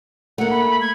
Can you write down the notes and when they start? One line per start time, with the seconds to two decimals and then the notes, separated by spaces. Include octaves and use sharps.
0.38 A3 A#3 F#5
0.50 B5
0.81 G#6